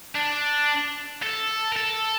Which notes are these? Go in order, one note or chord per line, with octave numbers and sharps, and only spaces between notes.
D4
A4
A#4
A4